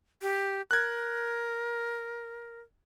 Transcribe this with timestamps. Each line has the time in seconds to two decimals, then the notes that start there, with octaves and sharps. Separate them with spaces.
0.22 G4
0.71 A#4 F#6 G#6